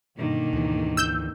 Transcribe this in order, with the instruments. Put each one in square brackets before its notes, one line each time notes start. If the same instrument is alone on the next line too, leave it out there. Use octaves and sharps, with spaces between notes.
[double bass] G2 B2 [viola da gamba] D3 D#3 A#3
[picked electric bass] D2 E3 [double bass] G#2
[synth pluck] E6 G6